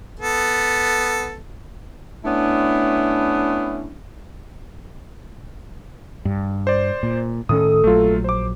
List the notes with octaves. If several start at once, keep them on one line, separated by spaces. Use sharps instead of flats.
B3 A4
A3 B3 C#4 D4 E4
G2
C5 D5
A#2
A2 D#3 C#4 A4 D#6
A#1 F#3 A3 F4
C5 D6